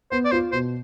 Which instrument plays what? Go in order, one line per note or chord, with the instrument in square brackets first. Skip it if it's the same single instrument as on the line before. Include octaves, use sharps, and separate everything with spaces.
[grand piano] B3 [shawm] C5
[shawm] D5
[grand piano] F4 [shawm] C5
[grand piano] B2 [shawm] C5